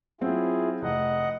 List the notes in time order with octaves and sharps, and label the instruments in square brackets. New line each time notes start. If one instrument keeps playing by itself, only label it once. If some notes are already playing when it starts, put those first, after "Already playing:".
[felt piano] F#3 C4 [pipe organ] E4 F4 G#4
[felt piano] F1 [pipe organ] D#5 F#5